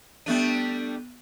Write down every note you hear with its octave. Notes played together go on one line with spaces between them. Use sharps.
G3 A3 B3 D4 F#6 D#7